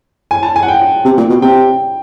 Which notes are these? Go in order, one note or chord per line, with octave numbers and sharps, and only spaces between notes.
G#5
A5
G#5
F#5
G5
C3
A#2
B2
C3 G5